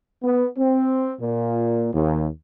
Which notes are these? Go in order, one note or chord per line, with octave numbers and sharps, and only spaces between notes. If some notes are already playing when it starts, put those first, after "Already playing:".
B3
C4
A#2
D#2